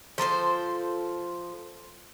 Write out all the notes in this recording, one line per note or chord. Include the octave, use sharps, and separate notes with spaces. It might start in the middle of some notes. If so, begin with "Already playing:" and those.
F3 A4 A#4 C5